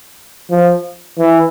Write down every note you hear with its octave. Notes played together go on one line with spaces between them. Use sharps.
F3
E3